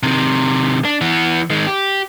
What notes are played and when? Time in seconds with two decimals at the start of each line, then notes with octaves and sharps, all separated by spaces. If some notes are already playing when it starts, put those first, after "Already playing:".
0.03 C3 D#3
0.85 D4
1.01 E3 B3
1.50 D#3 G#3
1.67 G4